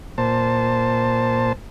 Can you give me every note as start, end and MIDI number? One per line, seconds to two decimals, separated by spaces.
0.18 1.53 46
0.18 1.53 72
0.18 1.53 81